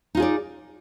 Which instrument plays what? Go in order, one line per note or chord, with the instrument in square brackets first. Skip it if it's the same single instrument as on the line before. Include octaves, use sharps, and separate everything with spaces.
[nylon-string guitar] D#4
F4
G#4
D5